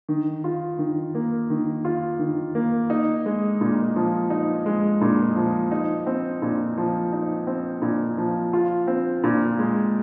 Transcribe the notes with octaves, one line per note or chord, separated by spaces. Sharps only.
D#3
F4
D#3
A#3
D#3
F4
D#3
A#3
D#4
G#3
A#2
F3
D#4
G#3
A#2
F3
D#4
C4
A#2
F3
D#4
C4
A#2
F3
F4
C4
A#2
G#3